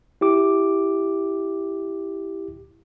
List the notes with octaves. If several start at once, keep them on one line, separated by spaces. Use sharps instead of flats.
E4 G4 D6